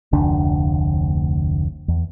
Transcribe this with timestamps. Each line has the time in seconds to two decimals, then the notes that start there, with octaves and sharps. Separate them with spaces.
0.13 F1 D2 D4
1.88 E2